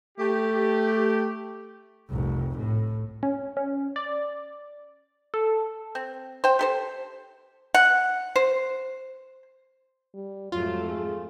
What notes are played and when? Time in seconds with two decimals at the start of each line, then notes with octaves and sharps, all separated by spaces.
0.18 A3 G4
2.10 F1 C2
2.58 A2
3.23 C#4
3.57 C#4
3.96 D5
5.34 A4
5.95 C4
6.44 C5 G5
6.59 G4 A4 C5
7.74 F#5
8.36 C5
10.14 G3
10.52 F2 G#2 F#3 A3 F4
10.88 G#4